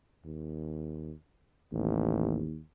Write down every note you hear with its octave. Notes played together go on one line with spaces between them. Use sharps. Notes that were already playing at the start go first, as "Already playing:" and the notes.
D#2
A1 D#2